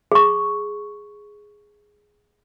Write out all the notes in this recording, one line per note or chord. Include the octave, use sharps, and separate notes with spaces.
G#4 C#6